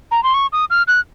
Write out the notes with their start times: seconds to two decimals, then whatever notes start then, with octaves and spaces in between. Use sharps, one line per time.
0.11 A#5
0.23 C6
0.34 C#6
0.52 D#6
0.70 F6
0.88 F#6